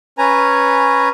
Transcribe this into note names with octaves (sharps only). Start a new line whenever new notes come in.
C#4 B4 G#5 A#5